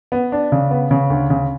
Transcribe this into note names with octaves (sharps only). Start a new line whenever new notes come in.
B3
D4
C#3
B3
C#3
D2
C#3